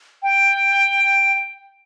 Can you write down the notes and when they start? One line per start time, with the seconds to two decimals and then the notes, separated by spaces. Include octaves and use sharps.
0.23 G5